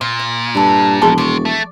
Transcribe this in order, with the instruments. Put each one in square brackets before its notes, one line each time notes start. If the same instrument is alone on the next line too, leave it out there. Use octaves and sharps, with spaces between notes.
[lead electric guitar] A#2 [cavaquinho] F5
[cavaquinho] F5
[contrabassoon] G2 [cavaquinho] A4 B4
[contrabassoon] E1 [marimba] F3 G#4 A5 [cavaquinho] B5 C6 D6
[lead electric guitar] C3 [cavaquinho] D5 C#6
[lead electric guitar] A3